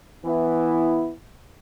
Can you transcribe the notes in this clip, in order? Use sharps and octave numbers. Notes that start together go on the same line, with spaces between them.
E3 B3 E4